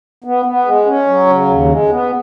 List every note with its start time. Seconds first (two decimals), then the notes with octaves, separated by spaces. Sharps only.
0.24 B3
0.45 B3
0.65 G#3
0.86 C#4
1.06 F#3
1.27 C#3
1.48 D#2
1.69 G#3
1.89 B3